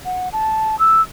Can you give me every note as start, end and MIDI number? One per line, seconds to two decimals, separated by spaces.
0.05 0.29 78
0.33 0.78 81
0.79 1.01 88